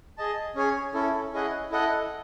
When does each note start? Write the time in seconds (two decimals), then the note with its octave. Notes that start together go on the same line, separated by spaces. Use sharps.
0.18 G#4 D#5 A5
0.56 C#4 G#4 C#5 G#5
0.94 C#4 E4 A4
1.33 C#4 E4 G#4 D#5 F#5
1.71 E4 A4 D#5 F#5